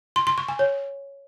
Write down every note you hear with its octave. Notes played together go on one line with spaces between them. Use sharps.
C6
C6
C#6
G#5
C#5